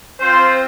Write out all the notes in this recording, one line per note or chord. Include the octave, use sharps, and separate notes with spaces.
C4 F4 C5